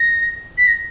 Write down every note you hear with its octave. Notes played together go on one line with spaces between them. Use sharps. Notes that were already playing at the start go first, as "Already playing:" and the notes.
Already playing: A#6
B6
A#6